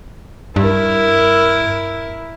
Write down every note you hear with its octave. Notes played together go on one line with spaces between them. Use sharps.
G2 E4 A#4